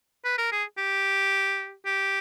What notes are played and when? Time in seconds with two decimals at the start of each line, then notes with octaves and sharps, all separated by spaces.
0.24 B4
0.38 A#4
0.52 G#4
0.78 G4
1.86 G4